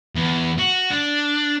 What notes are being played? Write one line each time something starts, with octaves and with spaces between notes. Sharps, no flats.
E2
F#4
D4